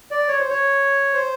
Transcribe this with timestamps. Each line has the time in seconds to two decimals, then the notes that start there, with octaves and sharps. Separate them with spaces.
0.11 D5
0.28 C#5
0.39 C5
0.50 C#5
1.14 C5